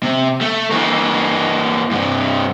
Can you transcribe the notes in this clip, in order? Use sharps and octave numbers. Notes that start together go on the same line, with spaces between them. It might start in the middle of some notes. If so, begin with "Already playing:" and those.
C3
A3
E3 A#3
G2 C3